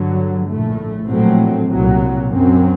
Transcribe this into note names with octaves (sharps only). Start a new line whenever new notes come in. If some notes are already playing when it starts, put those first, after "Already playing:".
Already playing: G2 D3 F#3
A#1 A2 A3
A#1 A2 F#3 A3 C4
C2 A#2 F#3
F#2 F#3 C4